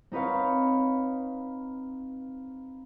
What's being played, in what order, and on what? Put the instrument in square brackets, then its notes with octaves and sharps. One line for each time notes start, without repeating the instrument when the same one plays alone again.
[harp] C4 D#4 B4 C#5 F5